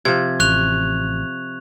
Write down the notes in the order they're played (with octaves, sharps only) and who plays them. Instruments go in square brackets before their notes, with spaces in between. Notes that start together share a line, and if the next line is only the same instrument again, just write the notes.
[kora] C3 F3 [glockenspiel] G#6
[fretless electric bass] A1 [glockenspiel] C#6 F#6 F7